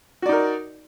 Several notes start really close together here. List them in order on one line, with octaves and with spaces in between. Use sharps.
F#4 D5 D#4 A#4